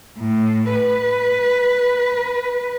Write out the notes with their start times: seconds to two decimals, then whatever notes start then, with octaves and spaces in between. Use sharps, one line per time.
0.19 A2
0.74 B4